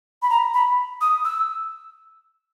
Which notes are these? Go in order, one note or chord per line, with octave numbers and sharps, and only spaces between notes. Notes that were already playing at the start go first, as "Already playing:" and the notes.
B5
A#5
B5
D#6
E6